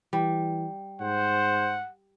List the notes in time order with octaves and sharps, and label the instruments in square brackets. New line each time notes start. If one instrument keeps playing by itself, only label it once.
[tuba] E3 [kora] G3
[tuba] G#2 [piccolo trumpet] C5 [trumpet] F#5